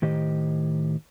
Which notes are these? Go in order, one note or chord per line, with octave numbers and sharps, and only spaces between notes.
A2 D#3 G4 C5 D#5